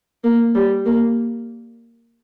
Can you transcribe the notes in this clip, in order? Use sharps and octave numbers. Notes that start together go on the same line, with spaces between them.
A#3
G3
A#3